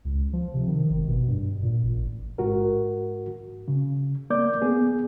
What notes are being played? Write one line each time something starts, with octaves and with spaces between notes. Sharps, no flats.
C#2
F3
C3
D#3
G#1
B2
G2
A#2
A1
A1
G#2 F#4 A#4
C#3
A#3 D5 D6 G6
B3 G#4